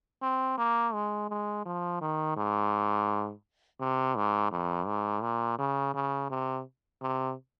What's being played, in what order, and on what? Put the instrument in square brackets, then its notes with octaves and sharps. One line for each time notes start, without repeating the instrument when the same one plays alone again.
[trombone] C4
A#3
G#3
G#3
F3
D#3
G#2
C3
G#2
F2
G#2
A#2
C#3
C#3
C3
C3